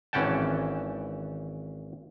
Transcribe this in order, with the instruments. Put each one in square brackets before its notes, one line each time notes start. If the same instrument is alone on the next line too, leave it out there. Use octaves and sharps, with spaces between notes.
[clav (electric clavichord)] G#1 E3 C#4 F#5 G5 A5